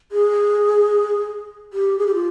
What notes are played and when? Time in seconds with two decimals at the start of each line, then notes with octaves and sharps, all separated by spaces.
0.12 G#4
1.73 G4
1.99 G#4
2.07 G4
2.14 F4